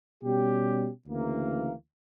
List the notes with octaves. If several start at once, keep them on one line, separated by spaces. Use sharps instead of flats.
B2 G3 C#4 G4
D2 C#3 E3 A#3